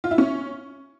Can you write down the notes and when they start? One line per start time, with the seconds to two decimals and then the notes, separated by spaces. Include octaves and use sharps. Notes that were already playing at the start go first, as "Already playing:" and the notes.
0.04 F4
0.11 E4
0.18 C#4